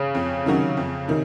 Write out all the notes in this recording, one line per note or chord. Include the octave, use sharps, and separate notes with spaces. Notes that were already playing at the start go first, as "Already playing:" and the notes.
Already playing: C#3
F2
C3 D#3 F#3 C#4
F2
C3 D#3